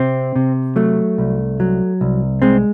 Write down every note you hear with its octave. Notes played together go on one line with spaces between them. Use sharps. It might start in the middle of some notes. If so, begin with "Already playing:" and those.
Already playing: C3 C4
C3
F#3 A3
C2
F#3
C2
G#3 C4